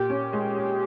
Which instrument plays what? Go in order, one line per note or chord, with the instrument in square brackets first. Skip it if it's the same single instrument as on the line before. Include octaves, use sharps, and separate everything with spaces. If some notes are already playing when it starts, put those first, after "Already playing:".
Already playing: [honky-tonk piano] A#2 [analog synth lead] G4
[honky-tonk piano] C#4
G#3
G#4